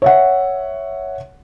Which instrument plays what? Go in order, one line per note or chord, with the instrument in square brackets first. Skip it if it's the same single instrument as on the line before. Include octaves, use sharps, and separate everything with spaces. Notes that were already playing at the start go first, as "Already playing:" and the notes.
[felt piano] C#5 E5 F#5